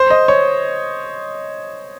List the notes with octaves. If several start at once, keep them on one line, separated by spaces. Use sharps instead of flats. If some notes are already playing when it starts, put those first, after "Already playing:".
Already playing: C5
D#5
C#5